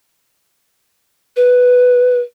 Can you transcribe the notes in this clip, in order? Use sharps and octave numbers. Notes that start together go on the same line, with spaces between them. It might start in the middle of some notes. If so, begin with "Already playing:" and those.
B4